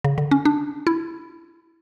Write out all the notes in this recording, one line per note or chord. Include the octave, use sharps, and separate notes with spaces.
C#3
D3
C#4
D4
E4